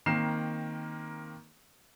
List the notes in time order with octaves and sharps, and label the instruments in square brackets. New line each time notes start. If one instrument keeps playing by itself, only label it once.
[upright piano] D#3 A#3 C4 C7 E7